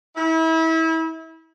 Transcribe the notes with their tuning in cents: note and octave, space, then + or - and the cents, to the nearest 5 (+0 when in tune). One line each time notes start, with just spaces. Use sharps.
E4 -30